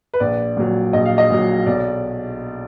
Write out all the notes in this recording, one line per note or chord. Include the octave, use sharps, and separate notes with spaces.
B4
A#1 D5
A#2 F#3
A#1 D#5
F5
D#5
A#2 F#3
B1 D5